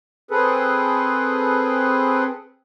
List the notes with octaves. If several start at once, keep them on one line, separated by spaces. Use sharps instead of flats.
C4 G#4 A4 B4